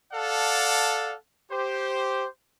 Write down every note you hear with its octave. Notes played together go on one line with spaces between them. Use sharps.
A4 D5 F5 F#5 A5
G4 C5